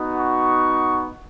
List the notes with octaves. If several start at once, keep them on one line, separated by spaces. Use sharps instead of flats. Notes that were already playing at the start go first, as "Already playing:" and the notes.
Already playing: B3 D#4 F#4
C#6